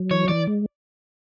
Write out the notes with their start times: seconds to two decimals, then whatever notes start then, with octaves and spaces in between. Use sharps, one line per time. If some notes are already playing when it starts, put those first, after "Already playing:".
Already playing: F#3
0.11 E3 C#5
0.28 E3 D5
0.48 G#3